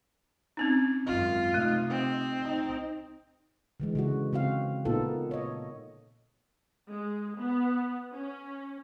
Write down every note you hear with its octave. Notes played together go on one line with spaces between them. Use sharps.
C4 C#4 D#4
G#1 F#2 F4
C3 A3 D#4
C4
D#4
D3 E3 G#3
C#3 G#3 F#4
C#3 C4 F#4 F5
A#2 A#3 B3 D#4 F4 A4
C#5 D#5
G#3
B3
C#4